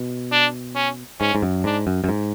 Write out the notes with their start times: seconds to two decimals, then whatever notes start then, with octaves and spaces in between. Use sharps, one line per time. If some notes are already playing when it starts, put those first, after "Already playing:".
Already playing: B2
0.32 D4
0.75 C#4
1.20 G#2 C#4
1.35 G#2
1.42 F#2
1.64 G#2 D4
1.87 F#2
2.04 F#2
2.09 G#2